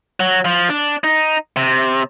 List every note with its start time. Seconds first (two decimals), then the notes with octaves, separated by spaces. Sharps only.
0.20 F#3
0.45 F3
0.70 D4
1.04 D#4
1.56 C3